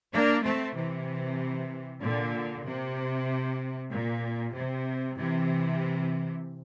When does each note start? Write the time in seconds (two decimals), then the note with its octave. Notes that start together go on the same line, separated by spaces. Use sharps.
0.13 A#3 D4
0.45 A3 C4
0.76 C3 E3
2.02 A#2 D3
2.66 C3
3.92 A#2
4.55 C3
5.18 C3 E3